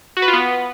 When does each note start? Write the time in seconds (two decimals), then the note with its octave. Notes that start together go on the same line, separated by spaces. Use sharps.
0.17 F#4
0.22 B4
0.28 F4
0.33 B3